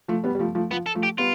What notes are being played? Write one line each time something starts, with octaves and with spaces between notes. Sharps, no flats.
F3 A3
G3 B3
G3
F3 A3
F3 A3
F3 B3
A4
F3 A3
G4
G3 B3 F4